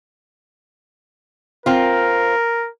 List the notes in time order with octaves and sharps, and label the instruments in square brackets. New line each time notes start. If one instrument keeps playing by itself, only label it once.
[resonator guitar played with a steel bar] C4 F4 [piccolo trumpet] A#4